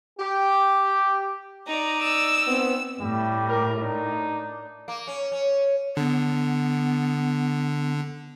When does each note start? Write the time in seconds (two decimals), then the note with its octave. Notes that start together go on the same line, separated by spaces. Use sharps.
0.18 G4
1.67 D#4 D5 A#5
2.03 E6
2.46 B3 C4
3.01 A2 G3
3.48 A#4
3.82 D4 D#4
4.88 A#3
5.07 C#4
5.32 C#4
5.97 D3 B3